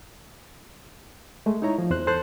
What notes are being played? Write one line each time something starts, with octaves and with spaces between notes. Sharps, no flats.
G#3 A3
D#4 E4 C#5 A#5
F3
E2 C5 F#6
A4 C5 A5 F#6